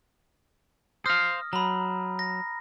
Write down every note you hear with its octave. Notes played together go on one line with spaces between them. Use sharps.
C5 F5 D#6 F6 A#6
F#3 A#5 B5
A#6